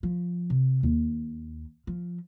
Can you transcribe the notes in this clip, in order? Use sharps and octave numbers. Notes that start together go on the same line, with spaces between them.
F3
C3
D#2
F3